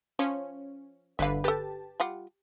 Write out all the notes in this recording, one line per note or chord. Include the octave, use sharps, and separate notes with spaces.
F3 C#4
G1 D3 B4 E5 F5
G4 A4 B4 A5
G3 F4 F#5